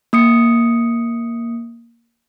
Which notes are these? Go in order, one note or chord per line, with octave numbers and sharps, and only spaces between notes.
A#3 D#6 C#7